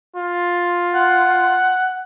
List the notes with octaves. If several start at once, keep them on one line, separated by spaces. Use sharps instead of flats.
F4
F#5